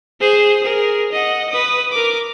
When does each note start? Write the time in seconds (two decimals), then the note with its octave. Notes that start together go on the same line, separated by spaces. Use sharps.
0.21 G#4 C5
0.64 G#4 A#4
1.12 D#5 F#5
1.50 B4 D#6
1.92 A#4 D6